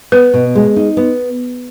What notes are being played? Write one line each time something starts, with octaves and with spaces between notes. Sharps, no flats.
B3 B4
B2
G#3
D#4
B3